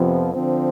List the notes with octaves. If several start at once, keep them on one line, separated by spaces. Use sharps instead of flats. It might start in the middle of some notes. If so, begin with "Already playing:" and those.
Already playing: F2 C3 F3 B3
D3 F3 C4